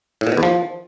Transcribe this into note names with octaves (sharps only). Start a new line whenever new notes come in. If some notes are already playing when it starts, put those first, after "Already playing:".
A2
A#2
B2
E2
F3